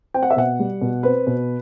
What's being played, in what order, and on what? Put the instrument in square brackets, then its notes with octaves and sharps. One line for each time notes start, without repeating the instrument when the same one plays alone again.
[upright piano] C4 G5
F#5
E5
B2 F#5
G3
B2
C4 B4
B2